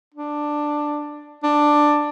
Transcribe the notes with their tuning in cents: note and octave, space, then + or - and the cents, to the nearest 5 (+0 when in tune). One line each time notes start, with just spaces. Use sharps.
D4 +10
D4 +10